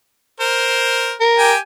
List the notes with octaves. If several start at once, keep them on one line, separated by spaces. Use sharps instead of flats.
A#4 C5
A#4
G4 G5 G#5